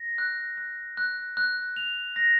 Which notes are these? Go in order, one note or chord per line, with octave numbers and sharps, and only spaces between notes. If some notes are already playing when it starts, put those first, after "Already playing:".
Already playing: A#6
F#6
F#6
F#6
F#6
F7
A#6